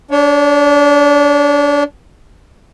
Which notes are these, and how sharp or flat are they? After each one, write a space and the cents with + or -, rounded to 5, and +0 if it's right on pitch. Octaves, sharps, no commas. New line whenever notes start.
D4 -25 C#5 +10